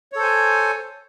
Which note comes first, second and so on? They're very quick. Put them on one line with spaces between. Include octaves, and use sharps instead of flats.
C#5 A4 C5 G#5